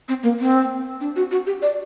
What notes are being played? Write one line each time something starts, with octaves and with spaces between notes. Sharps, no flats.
C4
A#3
C4
D4
F#4
F#4
G4
D5